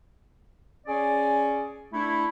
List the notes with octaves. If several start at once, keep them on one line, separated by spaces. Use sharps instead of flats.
C#4 G#4 D5
A3 D4 E4